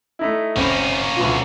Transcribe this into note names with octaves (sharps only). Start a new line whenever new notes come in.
A3 D#4 E4
F#1 A#3 C4 C#4 B5
D2 B2 F4